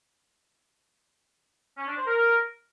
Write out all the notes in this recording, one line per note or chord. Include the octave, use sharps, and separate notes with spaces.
C#4
D4
C5
A#4